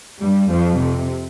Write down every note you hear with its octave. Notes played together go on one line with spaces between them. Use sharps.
G2 G3
F2 F3
C3